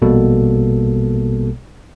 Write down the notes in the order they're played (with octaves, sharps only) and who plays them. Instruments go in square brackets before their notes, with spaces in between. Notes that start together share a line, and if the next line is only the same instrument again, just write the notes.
[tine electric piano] A#1 B2 G3 A#3 A4